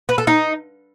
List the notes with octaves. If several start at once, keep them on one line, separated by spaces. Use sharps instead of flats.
B4
A4
D#4